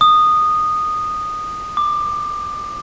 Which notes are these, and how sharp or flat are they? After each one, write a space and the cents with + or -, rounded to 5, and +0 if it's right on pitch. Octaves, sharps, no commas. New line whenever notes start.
D#6 -15
D6 +20